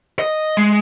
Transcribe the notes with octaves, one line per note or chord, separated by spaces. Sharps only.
D#5
G#3